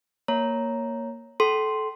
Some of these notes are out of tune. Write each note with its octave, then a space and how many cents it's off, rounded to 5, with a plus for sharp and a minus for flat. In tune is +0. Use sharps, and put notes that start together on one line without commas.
A#3 +0 C#5 +0 A#5 +0
A4 -25 G5 -35 C6 +0